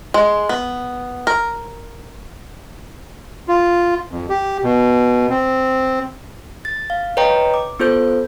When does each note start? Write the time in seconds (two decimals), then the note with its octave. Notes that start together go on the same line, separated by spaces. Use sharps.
0.14 G#3
0.49 B3
1.27 A#4
3.48 F4
4.11 F2
4.29 G4
4.64 B2
5.30 C4
6.65 A6
6.90 F5
7.17 B4 C#5 D#5 G5 A#5
7.54 D6
7.80 B3 F4 A4 C5 G6